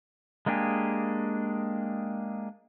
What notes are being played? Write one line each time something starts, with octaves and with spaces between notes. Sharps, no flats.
G#3 A#3 D4 G4 G#4